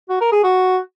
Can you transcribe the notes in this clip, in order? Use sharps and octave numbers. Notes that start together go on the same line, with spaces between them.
F#4
A#4
G#4
F#4